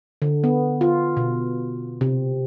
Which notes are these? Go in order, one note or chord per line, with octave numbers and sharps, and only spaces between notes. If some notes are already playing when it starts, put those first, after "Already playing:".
D3
B3
F4
B2
C3